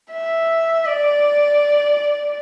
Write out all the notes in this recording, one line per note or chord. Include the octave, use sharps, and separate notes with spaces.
E5
D5